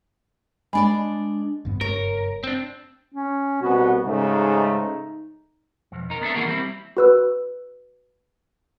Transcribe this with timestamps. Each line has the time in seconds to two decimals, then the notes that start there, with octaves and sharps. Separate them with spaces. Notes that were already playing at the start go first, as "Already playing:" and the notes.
0.73 G#3 D4 D5 G#5 B5
1.65 F#1 G2 B3
1.81 A#4 C#5
2.44 C4 D4
3.14 C#4
3.62 C2 B2 B3 F#4
4.04 G#2 C#3 A3 D#4
5.92 B1 F2
6.10 D#4 A#4
6.21 B3 D4 A4 E5
6.34 E3 A#3 F#4 G#4 A#4
6.47 G3 C4 E4
6.97 F#4 B4 E6